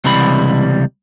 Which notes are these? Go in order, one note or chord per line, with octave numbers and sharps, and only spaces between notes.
C#2 C3 E3 G3 B5